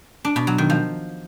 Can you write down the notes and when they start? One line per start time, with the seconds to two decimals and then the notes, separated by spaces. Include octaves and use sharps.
0.25 D4
0.36 B2
0.47 F#3
0.58 D#3
0.70 F3